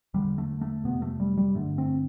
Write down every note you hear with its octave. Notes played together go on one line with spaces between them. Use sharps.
E2 D3 G3
A3
A3
F2 C3 B3
A3
G3
G3
G2 D3 A3
C4